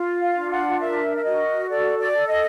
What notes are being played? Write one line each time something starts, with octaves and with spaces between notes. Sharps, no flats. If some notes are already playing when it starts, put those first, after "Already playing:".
Already playing: F4
F5
D4
F#5
A#4 E5
E5
F#4 D#5
A4 D5
D5
A4
D#5